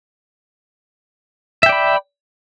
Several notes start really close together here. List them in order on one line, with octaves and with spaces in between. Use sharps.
E5 G5 D5 B5